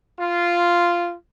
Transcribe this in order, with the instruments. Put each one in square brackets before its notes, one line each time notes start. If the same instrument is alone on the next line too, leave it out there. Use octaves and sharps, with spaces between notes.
[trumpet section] F4